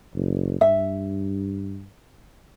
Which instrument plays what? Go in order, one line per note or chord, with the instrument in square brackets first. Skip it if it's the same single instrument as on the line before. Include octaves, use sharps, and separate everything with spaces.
[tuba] F#1
[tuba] G2 [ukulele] E5